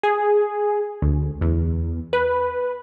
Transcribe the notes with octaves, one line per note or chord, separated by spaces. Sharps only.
G#4
D2
E2
B4